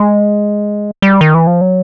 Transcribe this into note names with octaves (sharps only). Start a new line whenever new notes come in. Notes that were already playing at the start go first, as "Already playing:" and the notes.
Already playing: G#3
G3
D#3
E3
F3
F#3